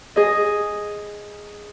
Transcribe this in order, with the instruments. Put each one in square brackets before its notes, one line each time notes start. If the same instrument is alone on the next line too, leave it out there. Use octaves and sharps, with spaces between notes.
[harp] G#4 D#5